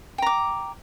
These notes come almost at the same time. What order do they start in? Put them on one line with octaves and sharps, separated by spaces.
G5 A#5 D6